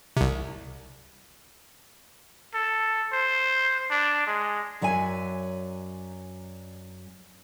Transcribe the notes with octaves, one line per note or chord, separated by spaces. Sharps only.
C2 C3
A4
C5
D4
G#3
F#2 F#3 D5 E5 G#5